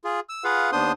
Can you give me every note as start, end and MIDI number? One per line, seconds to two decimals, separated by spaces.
0.05 0.20 65
0.05 0.20 68
0.29 0.44 88
0.44 0.71 65
0.44 0.71 68
0.44 0.71 71
0.44 0.71 77
0.44 0.71 78
0.72 0.92 39
0.72 0.92 59
0.72 0.92 62
0.72 0.92 72
0.72 0.92 84
0.72 0.92 87